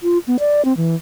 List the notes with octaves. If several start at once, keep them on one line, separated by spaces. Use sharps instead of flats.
F4
B3
D5
C4
E3